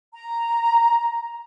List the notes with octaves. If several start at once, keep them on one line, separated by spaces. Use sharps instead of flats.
A#5